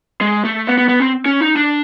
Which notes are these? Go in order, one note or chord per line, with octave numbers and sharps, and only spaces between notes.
G#3
A3
B3
B3
B3
C4
C#4
D#4
D4